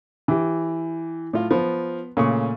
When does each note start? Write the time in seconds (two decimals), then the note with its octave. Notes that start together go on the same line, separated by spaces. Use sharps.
0.28 E3 G4
1.33 A2 F4
1.51 F3 B3
2.17 A#2 C#3 A3 C#6